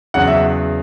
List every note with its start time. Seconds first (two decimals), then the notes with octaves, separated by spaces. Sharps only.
0.14 E2 C#3 F#3 F#5
0.27 E5